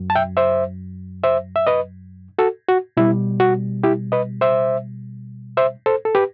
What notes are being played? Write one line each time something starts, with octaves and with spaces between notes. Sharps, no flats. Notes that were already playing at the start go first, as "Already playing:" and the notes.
Already playing: F#2 F#3
A5
E5 G5
C5 E5
C5 E5
E5
B4 D#5
F#4 A4
F#4
B2 G3 E4
F#4
E4 G4
B4 D#5
C5 E5
C5 E5
A4 C5
A4
G4 B4